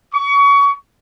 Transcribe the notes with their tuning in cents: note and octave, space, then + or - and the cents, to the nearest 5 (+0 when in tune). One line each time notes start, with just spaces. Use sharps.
C#6 +30